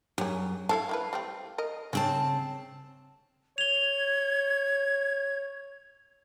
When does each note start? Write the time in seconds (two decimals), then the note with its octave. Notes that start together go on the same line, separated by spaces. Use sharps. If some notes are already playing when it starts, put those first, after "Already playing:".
0.18 F#2 G4 G#4
0.69 E4 A4 F5 A5
0.89 A#3 E4 B4
1.13 G3 A3 C4
1.58 A#4 D#5
1.93 C#3 G#3 C4 C#4 A5
3.58 C#5 G#6 F7 G7